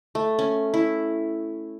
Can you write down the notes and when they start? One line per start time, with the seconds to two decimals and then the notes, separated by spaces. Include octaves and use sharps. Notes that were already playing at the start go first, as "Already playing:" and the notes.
0.15 A3
0.39 C#4
0.74 E4